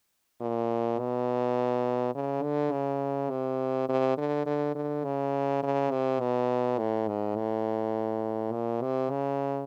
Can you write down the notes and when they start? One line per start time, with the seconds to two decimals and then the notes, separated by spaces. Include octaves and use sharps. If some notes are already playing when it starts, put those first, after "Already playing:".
0.41 A#2
0.99 B2
2.15 C#3
2.43 D3
2.72 C#3
3.30 C3
3.89 C3
4.17 D3
4.46 D3
4.75 D3
5.04 C#3
5.63 C#3
5.91 C3
6.20 B2
6.78 A2
7.08 G#2
7.36 A2
8.52 A#2
8.82 C3
9.10 C#3